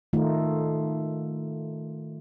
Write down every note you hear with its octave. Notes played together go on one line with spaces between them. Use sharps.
D#3 A3 D#4 F4